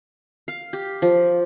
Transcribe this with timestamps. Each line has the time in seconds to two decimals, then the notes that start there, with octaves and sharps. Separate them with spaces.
0.48 F5
0.73 G4
1.02 F3